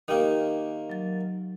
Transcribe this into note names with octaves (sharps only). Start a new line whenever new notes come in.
D#3 A#3 D#4 G4 G5
F#3 A6